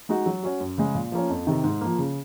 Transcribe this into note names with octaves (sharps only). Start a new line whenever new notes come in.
G#3 D#4 F#4
F#3
C#4 F#4
F#2
C#3 G#3
A#2
F3 A#3 C#4
F2
C3 D#3
G#2
F3 A#3
C#3